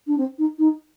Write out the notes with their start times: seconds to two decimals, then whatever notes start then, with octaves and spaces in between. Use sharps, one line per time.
0.07 D4
0.17 C4
0.38 D#4
0.59 D#4